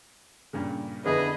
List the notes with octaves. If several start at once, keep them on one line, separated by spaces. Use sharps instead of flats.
G2 A#2 C#3
F2 D3 B3 E4 G#4 B4 D#5